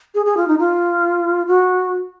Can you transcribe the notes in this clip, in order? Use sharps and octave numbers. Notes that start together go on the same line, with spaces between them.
G#4
G#4
F4
D#4
F4
F#4